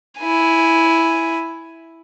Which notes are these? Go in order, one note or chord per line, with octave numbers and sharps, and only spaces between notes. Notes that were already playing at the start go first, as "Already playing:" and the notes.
E4 G#5